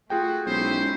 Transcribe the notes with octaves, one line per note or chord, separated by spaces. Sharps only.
A3 F4 F#4 G#4 G5
B1 G#3 C#4 E4 C5